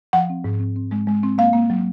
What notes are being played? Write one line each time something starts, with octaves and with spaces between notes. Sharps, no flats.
F3 F#5
C4
G#2
C4
C4
G#3
G#3
C4
A#3 F5
A#3
F#3